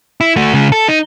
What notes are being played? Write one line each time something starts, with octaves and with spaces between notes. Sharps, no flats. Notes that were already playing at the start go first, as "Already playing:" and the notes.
E4
A3 F#4
C#3 G#3
A4
D#4